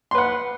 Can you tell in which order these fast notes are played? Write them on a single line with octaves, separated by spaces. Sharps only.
C6 B4 F#5